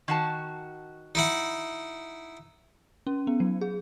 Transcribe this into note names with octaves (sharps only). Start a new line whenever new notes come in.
D#3 F#4 A5
D#4 E4 F#5
C#4
B3
F#3
G#4